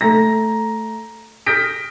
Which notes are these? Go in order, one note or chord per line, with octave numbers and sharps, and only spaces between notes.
A3 A#5 A#6
D#6 F6 G6 A#6 B6 D7